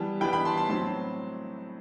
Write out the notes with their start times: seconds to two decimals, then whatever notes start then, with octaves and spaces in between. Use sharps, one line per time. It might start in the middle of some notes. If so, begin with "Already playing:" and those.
Already playing: E3 G3 B3 A5
0.21 E3 G3 B3 G5 B5
0.33 G5 B5
0.45 A5 C6
0.57 A5 C6
0.69 A2 F#3 C4 A5 C6